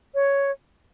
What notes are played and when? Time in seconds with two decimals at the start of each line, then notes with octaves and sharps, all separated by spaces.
0.14 C#5